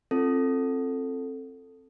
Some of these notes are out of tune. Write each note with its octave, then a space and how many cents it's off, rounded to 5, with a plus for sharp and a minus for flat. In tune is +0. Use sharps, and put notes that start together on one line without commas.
C4 +20 F4 -25 A4 +5